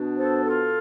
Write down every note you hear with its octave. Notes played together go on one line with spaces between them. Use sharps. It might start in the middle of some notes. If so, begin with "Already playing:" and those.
Already playing: B2 B3 D4
A4 C5
F4 A4